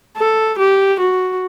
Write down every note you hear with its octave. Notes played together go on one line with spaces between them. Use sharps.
A4
G4
F#4